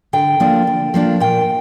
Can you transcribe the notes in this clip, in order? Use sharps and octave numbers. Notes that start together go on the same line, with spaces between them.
D3 G5
F3 A#3 D4
D3
F3 A#3 D4
A#2 G5